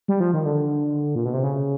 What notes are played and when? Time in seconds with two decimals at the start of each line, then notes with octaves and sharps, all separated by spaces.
0.08 G3
0.20 F3
0.33 D#3
0.45 D3
1.15 A#2
1.25 B2
1.34 C3
1.43 C#3